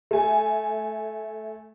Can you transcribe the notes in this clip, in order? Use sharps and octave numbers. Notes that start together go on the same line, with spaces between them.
A3 G#5